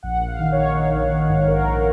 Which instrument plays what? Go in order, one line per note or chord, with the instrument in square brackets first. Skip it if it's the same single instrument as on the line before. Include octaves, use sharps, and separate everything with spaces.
[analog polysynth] A#1 F#5
A#1
F5
D#3
C#5
A#1
D#3
A#1
D#3
G#2
A#1 A#4
A#1